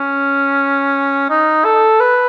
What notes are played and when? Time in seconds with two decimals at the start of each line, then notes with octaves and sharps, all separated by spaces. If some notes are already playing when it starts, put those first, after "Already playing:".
Already playing: C#4
1.30 D#4
1.65 A4
2.00 B4